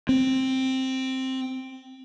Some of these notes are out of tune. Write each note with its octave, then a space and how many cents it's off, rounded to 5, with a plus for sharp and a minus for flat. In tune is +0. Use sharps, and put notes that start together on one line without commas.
C4 +5